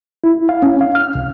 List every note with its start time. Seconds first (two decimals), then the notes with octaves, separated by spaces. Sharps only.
0.24 E4
0.49 F5
0.63 C#4
0.81 F5
0.95 F6
1.15 C2